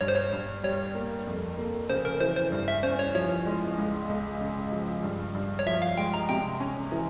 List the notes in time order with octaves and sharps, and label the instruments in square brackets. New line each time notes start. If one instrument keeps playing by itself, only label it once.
[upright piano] G2 [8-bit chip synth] C#5
[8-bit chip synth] C5
C#5
[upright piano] G2
[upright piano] G3 [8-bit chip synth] C#5
[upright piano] A#3
F2
A#3
[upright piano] C#3 [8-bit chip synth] C5
[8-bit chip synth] A#4
[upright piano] E3 [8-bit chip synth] C5
[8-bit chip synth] C5
[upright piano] G2
[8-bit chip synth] E5
[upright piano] C#4 [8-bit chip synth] C5
[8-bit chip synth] C#5
[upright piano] F3 [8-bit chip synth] C#5
[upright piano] G#3
C#2
C#2
C#3
F3
G2
G2
[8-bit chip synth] C#5
[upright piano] F3 [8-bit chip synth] E5
[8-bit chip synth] F5
[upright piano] G#3 [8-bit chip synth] G5
[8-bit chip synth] A#5
[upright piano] C3 [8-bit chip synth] G5
[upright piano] C#4
E3